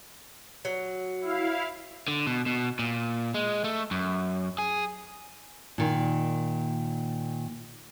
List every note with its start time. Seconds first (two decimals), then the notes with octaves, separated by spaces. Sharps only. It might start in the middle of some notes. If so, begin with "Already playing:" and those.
0.65 F#3
1.21 E4 F5
2.08 D3
2.27 B2
2.46 B2
2.79 A#2
3.34 G#3
3.64 A3
3.91 F#2
4.58 G#4
5.78 A#2 D#3